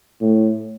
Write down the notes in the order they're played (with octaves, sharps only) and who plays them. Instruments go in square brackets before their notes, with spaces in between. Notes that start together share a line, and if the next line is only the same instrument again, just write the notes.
[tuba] A2